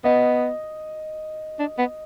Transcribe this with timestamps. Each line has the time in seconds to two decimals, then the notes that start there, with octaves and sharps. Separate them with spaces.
0.04 B3 D#5
1.59 D4
1.78 B3